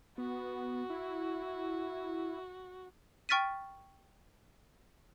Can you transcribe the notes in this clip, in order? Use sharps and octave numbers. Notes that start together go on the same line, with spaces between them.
B3 F#4
E4
G5 C#6 F6 A6 B6 D#7